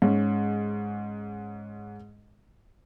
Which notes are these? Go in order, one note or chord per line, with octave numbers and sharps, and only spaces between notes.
G#2 C#4